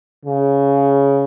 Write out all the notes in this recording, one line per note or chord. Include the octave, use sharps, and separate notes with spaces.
C#3